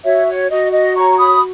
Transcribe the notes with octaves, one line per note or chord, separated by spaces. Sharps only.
F#4 C#5 E5
C#5
F#4 D#5
D#5
C#5 A#5 C#6
B5 D#6